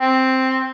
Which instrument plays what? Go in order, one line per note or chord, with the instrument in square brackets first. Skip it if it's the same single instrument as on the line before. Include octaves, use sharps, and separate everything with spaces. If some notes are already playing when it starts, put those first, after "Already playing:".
[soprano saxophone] C4